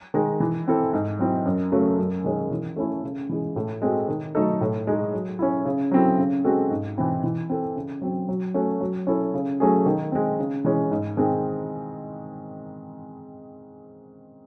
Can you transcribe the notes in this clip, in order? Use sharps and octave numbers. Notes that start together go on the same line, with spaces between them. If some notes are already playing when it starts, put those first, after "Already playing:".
D#3 G#3 D#4
E3
C4 E4 A4
G#2
F#3 C4 E4
F#2
C#3 F#3 A3
F#2
D#3 G#3 C#4
E3
A3 C#4 E4 A4
C#3
E3 G#3
A2
G#3 C4 F#4 A4
D#3
F#3 A3 D#4 A4
A2
G#3 D#4 G#4
F#3
C#4 E4
C#3
F#3 C4 E4 A4
C#3
G#3 C4 F#4 A4
G#2
E3 C4 E4
E3
C4 E4 A4
C#3
F#3 C4
F#3
A3 C#4 F#4
F#3
C#4 E4 A4
C#3
F#3 A3 C#4 G#4
D#3
G#3 C4
C#3
E3 G#3 C#4
G#2
D#3 G#3 C4